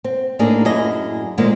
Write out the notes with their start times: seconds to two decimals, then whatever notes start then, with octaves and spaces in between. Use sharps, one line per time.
0.04 C4
0.39 A2 A#3 D4 D#4 G#4
0.65 F#2 E4 G#4 D#5
1.38 F#2 A#2 D#3 G#3 A#3 C4